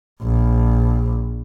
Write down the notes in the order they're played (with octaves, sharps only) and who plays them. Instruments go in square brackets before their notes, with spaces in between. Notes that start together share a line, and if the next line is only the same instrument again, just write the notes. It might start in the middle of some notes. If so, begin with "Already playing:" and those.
[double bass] A#1